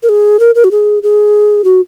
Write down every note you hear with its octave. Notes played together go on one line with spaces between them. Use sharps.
A#4
G#4
A#4
A#4
F#4
G#4
G#4
F#4